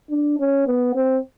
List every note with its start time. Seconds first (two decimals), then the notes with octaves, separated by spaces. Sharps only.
0.10 D4
0.40 C#4
0.67 B3
0.95 C4